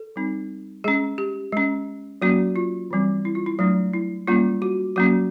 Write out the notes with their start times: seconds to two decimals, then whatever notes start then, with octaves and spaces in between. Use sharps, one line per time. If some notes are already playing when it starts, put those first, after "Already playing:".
Already playing: A4
0.16 G3 C4 D#4
0.84 G#3 C#4 G#4
1.18 G4
1.52 G#3 C#4
2.22 F#3 A#3 C#4 F#4
2.56 F4
2.91 E3 G3 C4
3.25 E4
3.35 F4
3.46 E4
3.59 F#3 A3 D4
3.93 E4
4.27 G3 A#3 C#4 F4
4.62 F#4
4.96 F#3 A#3 C#4 F#4